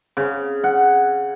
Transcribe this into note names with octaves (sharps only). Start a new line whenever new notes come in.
C#3
F#5